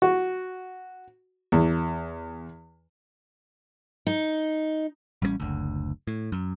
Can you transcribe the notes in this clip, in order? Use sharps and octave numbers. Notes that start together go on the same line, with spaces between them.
F#4
E2
D#4
A1 G3 G#3 C#4
F#1 D2
A2
F#2